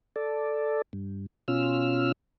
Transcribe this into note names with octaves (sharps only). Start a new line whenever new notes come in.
A4 D5
G2
B2 C#4 F4 E6 F6